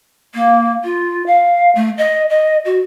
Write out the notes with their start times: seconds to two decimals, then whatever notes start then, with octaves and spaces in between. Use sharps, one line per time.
0.34 A#3
0.84 F4
1.26 F5
1.75 A3
1.97 D#5
2.30 D#5
2.65 F#4